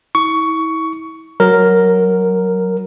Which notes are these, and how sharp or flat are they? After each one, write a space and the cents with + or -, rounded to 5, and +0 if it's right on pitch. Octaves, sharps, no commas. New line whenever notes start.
E4 -35 C#6 +15
F#3 +0 A#4 +0